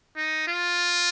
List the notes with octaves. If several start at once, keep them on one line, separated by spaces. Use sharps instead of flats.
D#4
F4